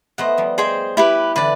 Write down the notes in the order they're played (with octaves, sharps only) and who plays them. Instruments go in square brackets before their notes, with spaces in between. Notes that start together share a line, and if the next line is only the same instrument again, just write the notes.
[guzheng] A3 B3 [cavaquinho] C5 D#5 F#5
[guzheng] F3 G3
[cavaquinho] G#4 C5 D#5 G5
E4 G4 B4
[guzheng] D3 E3 [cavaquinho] B4 D5